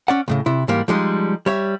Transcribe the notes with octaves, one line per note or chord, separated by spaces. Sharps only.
C#4 D5 F#5
C#2 A2 C#3
C3 E4
G#2 E3 G3 A#3
F3 G3 G#3 D#4
G3 C#5 E5